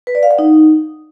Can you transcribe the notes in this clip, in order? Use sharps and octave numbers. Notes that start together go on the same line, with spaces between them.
B4
D5
F5
F#5
D#4